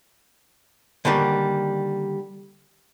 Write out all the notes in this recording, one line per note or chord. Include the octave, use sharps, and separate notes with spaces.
D3 D#3 G3 A#3